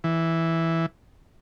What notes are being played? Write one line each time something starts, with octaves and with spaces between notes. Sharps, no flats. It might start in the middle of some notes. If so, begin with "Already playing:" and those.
E3